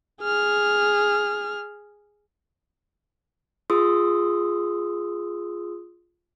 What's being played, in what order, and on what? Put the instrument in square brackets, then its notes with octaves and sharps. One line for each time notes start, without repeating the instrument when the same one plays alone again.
[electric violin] G#4 F6
[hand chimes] F4 G#4 C6 D#6 E6